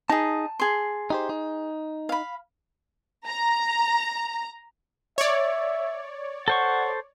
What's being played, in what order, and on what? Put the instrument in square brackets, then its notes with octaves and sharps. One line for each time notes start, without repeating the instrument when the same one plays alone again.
[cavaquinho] D#4 G#4 [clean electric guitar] A5
[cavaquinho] G#4 C6
[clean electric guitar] D#4 G4 C5
D#4
[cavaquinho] F5 B5
[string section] A#5
[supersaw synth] C#5 D5 [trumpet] E5
[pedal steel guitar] A4 C5 C#6 [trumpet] F#5